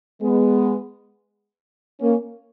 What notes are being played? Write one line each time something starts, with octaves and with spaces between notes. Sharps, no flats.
G#3 B3
A#3 C#4